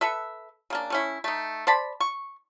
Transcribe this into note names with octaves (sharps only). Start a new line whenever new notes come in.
A4 B4 E5
C#3 A#3 D4
A3 C#4 E4
A3 D#4
C5 D5 A5 B5
C#6